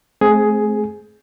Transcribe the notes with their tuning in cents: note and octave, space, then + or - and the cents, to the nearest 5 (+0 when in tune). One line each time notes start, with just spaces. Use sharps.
A3 -40 C4 +0 G#4 +10